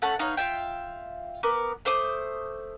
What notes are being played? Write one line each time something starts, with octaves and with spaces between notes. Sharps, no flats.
A3 C#4 F#5 A5
B3 D#4 C#5 F5
F4 E5 G5
B3 A#4 D6
A3 C5 D6 D#6